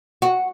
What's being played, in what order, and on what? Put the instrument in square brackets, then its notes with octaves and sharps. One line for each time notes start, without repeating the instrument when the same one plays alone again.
[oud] F#4